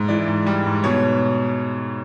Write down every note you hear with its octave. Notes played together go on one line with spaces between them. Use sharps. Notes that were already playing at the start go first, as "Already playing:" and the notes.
Already playing: G#2
E3 D5
G#2
G3
G#2
B2 C#5